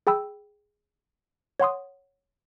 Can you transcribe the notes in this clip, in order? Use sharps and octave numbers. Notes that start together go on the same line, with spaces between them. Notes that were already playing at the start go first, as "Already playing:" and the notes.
G#4 G5 B5 E6
C#5 F#5 C6 D#6